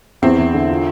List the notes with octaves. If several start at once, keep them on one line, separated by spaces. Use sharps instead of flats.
E2 C4 E4
E2
D3
F4